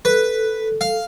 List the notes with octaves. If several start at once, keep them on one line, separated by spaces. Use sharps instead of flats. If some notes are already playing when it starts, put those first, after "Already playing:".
A4 B4
F5